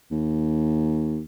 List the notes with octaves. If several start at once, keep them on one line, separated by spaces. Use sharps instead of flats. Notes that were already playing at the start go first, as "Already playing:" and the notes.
D#2